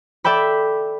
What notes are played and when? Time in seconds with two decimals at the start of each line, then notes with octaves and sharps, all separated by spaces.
0.24 A4 D5 E5 G5 B5